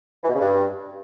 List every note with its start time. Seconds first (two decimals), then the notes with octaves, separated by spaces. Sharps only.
0.24 E3
0.29 B2
0.35 C#3
0.40 G2